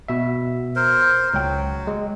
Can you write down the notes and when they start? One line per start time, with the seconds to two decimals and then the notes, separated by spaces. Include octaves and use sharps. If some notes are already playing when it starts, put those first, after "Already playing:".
0.08 B2 E5
0.76 A#4 C5
1.34 C#2 F#3 G5
1.87 G#3